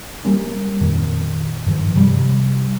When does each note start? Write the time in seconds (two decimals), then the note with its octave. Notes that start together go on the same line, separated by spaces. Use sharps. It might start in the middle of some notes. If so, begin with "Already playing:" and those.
0.25 G3 A#3 C#4
0.81 F2 A#2 D#3
1.66 G2 D#3 F3
1.96 C3 G3